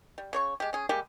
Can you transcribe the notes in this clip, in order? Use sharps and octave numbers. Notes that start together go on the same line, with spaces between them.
G3
C#3 C#5 C#6
G#3 G4
C#4 G#4
G3 G#3 A#3 G4